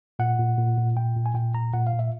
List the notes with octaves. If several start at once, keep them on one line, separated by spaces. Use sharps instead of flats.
A#2 F#5
A#2
A#2
A#2
A#2 G5
A#2
G#5
A#2 G5
A#2 A#5
A#2 F#5
F5
A#2
E5